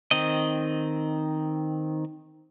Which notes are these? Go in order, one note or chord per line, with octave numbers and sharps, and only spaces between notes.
D#3 C4 D#5